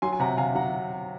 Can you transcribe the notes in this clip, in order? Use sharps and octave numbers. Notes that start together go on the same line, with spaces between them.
F#3 G#5 C6
G#5
C3 F#5 A#5
C3 F5 G#5
F#3 F#5 A#5